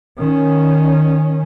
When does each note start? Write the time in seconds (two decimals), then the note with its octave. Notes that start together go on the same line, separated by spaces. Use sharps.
0.20 D#3 C#4